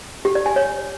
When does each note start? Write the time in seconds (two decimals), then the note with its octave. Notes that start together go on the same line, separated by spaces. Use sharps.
0.25 G4
0.35 D5
0.46 G#5
0.56 C#5